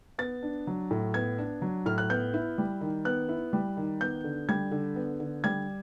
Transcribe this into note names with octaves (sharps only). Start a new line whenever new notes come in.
B3 A6
D4
F#3
A2
B3 G#6
D4
F#3
A2 F6
F#6
B3 G6
E4
G3
D#3
B3 F#6
E4
G3
D#3
B3 G6
D3
G3 G#6
D3
B3
D3
G3 G#6